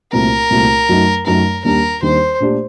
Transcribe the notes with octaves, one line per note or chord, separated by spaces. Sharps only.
C2 A#2 A3 C4 F#4 A#4
C2 A#2 A3 C4 F#4
F#2 F#3 A3 D#4
F#2 F#3 A3 D#4 A#4
D#2 D#3 G3 D4 A#4
D#2 D#3 G3 D4 C5
A#2 A3 D4 G4 D5